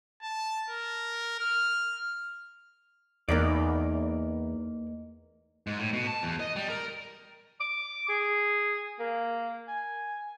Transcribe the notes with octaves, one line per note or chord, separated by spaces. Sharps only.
A5
A#4
F6
E2 A#3 D#4 D5
G#2
A2
B2
A5
E2
D#5
G3
A#4
D6
G#4
A#3
G#5